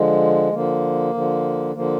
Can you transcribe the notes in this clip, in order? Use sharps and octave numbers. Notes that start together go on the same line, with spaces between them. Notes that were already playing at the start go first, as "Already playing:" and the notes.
Already playing: D3 F3 G#3
D3 F3 A#3
D3 F3
D3 F3 A#3